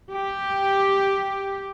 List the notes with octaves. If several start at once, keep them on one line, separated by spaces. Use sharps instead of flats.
G4